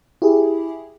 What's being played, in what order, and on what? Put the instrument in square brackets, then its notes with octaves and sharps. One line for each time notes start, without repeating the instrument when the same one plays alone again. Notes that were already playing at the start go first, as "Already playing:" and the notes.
[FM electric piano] E4 G4 G#4